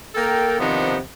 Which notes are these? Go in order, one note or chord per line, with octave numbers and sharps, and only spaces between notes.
A#3 A4 A#4 G5
C3 D#3 F3 B3 D4 D#4